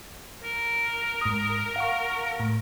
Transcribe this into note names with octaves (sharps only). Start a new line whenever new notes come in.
A#4
G#2 D#6
F5 F#5 C#6
A2